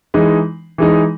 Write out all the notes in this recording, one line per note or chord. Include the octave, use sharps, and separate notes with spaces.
E3 G#3 D#4
E3 G#3 D#4